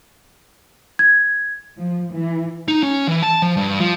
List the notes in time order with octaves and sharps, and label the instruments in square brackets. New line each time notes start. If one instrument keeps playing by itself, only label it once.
[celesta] G#6
[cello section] F3
E3
[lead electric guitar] D#4
C#4
E3
A5
F3
G2
F3